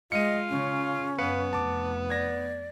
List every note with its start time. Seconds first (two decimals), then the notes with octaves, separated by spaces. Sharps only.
0.12 G#3 F4 D#5 C#7 D#7
0.49 C#3 C#4
1.18 F#2 B3 B4 F5 C#7
1.53 F1 A5 D6
2.10 D5 G#6 A#6